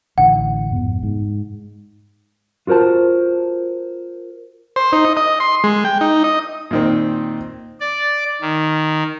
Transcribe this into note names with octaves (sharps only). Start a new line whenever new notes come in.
A1 D3 E3 F#5
F1 G#2 B3
G#2
F4 F#4 A#4 C5 A5
C5
D#4
D#5
D#5
C6
G#3
G5
D#4
D#5
A#2 D#3 C4
D5
D#3